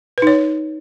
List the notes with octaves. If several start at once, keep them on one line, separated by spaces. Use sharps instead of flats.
D#4 B4 C#5